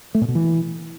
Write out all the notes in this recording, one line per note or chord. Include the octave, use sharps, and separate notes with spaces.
A3
A#2
B2
E3